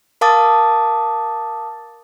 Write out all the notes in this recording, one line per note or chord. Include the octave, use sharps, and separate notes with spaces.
A#4 F5 A5 D6 D#6 A6